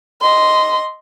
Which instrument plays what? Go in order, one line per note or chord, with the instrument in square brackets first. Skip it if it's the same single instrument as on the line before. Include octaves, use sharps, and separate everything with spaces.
[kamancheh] D#5 C6